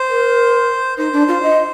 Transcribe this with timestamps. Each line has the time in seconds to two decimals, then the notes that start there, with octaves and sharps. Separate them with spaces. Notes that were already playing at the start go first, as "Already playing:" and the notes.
Already playing: C5
0.09 A#4
0.98 D#4 C5
1.13 D4
1.28 F4
1.43 D#5